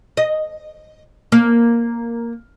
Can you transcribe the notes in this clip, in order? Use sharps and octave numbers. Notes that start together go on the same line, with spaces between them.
D#5
A#3